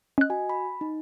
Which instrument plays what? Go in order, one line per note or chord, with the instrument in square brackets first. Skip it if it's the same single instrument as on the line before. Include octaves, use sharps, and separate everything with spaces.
[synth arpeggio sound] C#4 F#6 [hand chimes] D#5
[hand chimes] F#4 G#5
B5
D#4